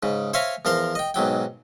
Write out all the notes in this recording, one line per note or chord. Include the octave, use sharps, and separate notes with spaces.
G#2 C#3
C5 C#5 E5 F5 G#5 A#5
E2 F3 A#4 C5 A#5 C6
D#5 G5
B1 G#2 F#3 G5